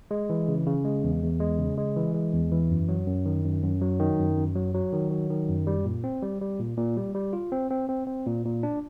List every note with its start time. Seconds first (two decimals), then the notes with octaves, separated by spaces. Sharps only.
0.11 G#3
0.30 E3
0.48 C#3
0.66 C#3
0.85 G#3
1.04 E2
1.23 E2
1.40 G#3
1.59 C#3
1.78 G#3
1.96 E3
2.15 G#3
2.33 E2
2.52 E3
2.70 F#2
2.89 F#3
3.07 F#2
3.26 D#3
3.44 F#2
3.63 F#2
3.81 F#3
4.00 D#3
4.19 F#2
4.37 F#2
4.56 F#3
4.74 F#3
4.93 D#3
5.11 F#3
5.30 D#3
5.49 F#2
5.67 G3
5.85 A#2
6.04 C4
6.23 G3
6.41 G3
6.59 A#2
6.77 A#2
6.97 G3
7.15 G3
7.33 F4
7.52 C4
7.71 C4
7.89 C4
8.07 C4
8.26 A#2
8.45 A#2
8.63 D4